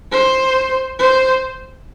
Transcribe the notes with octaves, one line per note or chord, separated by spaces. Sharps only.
C5
C5